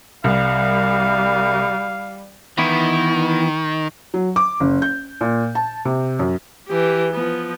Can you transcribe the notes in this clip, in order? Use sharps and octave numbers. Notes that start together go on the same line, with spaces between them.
C2 G3 F5
D#3 E3 B3 E4
F#3
D6
F#1
G6
A#2
A5
C3
F#2
E3 G4
F3 B3